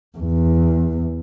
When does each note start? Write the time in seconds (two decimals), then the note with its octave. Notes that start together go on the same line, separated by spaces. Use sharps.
0.18 E2